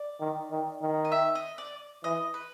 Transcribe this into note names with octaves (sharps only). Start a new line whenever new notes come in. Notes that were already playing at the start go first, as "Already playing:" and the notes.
Already playing: D5
D#3
D#3
D#3
D#5
E5
D#5
D5
E3 D#5
B4